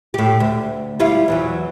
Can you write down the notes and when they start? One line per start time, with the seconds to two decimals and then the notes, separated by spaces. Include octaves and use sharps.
0.14 A2 G4
0.40 D2
1.00 G3 E4 F4
1.28 E2 E3 F#3